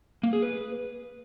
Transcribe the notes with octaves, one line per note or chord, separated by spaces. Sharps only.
A#3
G#4
B4